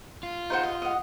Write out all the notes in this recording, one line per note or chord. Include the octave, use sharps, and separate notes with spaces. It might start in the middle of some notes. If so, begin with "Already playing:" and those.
F4
D#4 C5 F#5
D#5
D#5 F#5